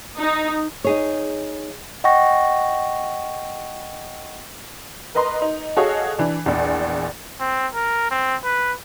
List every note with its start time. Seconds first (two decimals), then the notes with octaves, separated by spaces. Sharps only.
0.18 D#4
0.84 D#4 G#4 C#5
2.04 D#5 F#5 G5 C#6 A#6
5.15 A#4 B4 D#5 A#5 C6
5.42 D#4
5.76 F#4 G#4 A4 C#5 D#5 F5
6.18 E3 D4
6.46 A#1 E2
7.40 C4
7.74 A#4
8.11 C4
8.44 B4